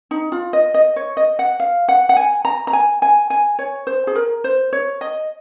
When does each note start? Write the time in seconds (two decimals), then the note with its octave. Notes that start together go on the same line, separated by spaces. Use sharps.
0.11 D#4
0.32 F4
0.53 D#5
0.74 D#5
0.96 C#5
1.17 D#5
1.39 F#5
1.60 F5
1.88 F#5
2.09 F#5
2.17 G#5
2.45 A#5
2.67 A#5
2.73 G#5
3.02 G#5
3.30 G#5
3.59 C#5
3.87 C5
4.07 G#4
4.16 A#4
4.44 C5
4.73 C#5
5.01 D#5